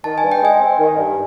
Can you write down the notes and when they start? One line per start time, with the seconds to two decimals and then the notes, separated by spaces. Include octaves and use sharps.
0.04 D#3 A5
0.18 G#5
0.23 G2
0.32 G5
0.42 G#3 G#5
0.60 C4
0.79 D#3
0.97 G2